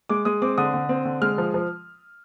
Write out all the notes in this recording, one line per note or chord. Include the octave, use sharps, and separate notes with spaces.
G#3 D6
G#3 D#6
C4 D6
D3 D#6
D3
C4
D3
G#3 F6
F3
F3